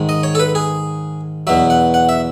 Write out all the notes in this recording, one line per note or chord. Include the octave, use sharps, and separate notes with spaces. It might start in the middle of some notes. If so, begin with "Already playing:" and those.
Already playing: G#2 D#3 G#3
D#5
C#5
A4
B4
G#4
E2 B2 F#3 E5
F#5
F#5
E5